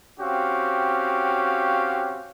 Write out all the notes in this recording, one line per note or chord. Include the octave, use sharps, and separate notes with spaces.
C4 C#4 F#4 G4 F5